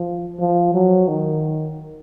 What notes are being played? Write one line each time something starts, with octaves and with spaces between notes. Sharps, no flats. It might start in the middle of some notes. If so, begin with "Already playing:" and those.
Already playing: F3
F3
F#3
D#3